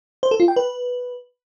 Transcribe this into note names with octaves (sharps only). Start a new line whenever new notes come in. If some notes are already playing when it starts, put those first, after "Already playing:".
C5
A4
F4
G5
B4